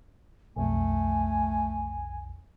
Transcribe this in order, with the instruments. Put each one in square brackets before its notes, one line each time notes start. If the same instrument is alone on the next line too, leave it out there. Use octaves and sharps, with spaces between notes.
[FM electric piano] B1 F2 [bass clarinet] A3 [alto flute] G#5